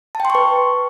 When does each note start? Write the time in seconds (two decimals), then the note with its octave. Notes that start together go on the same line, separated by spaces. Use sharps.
0.15 A5
0.20 G5
0.25 C6
0.30 C#6
0.35 B4